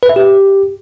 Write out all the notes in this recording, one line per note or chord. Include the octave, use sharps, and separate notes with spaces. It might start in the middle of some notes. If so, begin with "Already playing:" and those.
B4
E5
G4